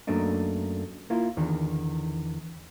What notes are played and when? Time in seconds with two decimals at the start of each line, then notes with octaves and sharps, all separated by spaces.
0.07 F#2 A3 A#3 D4 D#4
1.10 A#3 E4 F4
1.37 E2 D3 D#3